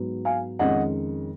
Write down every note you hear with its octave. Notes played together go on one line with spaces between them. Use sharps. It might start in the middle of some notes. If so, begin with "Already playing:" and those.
Already playing: G#2 F#3 B3
F5 G#5
F2 D#3 G#3 C#4 D#5 F#5